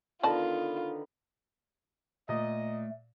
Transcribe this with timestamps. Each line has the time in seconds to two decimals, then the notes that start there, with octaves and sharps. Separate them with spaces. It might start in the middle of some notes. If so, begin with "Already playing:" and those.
0.23 D3 D#3 B3 F4 D5 D#5 A5
2.29 A#2 A3 D#5